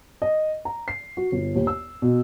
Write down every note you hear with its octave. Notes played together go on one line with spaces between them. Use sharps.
D#5
A#5
C7
F#4
G1
D#2
E6
B2